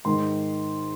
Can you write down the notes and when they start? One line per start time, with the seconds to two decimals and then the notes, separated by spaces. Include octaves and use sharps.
0.05 G#2 D#3 C6